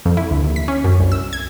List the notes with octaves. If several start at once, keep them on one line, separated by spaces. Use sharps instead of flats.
F2
E4
D2
D#2
B6
C#4
F#2
C2
E6
G#6